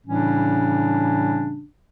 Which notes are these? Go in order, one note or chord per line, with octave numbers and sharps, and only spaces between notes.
A2 C#3 E3 G3 C#4 D4